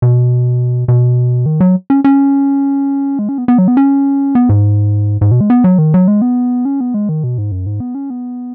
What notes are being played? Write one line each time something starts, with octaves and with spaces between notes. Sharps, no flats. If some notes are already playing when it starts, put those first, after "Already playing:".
B2
B2
D#3
F#3
C#4
C#4
G#3
C#4
B3
B3
F#3
B3
C#4
B3
G#2
G#2
B2
G#3
B3
F#3
D#3
F#3
G#3
B3
C#4
B3
G#3
D#3
B2
G#2
F#2
G#2
B3
C#4
B3